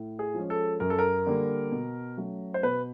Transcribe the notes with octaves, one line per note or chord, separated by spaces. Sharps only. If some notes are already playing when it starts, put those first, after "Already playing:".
Already playing: A2
G#4
F3 G#3 C#4
A4
F#2 A#4
A4
A#4
D3 G3 A#3
B2
F#3 A3 C#4
C5
B2 B4